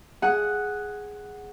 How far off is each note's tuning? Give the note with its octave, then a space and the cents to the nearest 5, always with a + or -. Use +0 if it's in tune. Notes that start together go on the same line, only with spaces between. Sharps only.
G#4 +0 F#5 +0